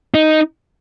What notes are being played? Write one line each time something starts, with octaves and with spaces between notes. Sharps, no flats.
D#4